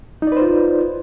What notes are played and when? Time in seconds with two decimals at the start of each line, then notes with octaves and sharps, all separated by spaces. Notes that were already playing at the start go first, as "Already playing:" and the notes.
0.22 D#4
0.27 D5
0.32 B4
0.37 C5
0.42 F4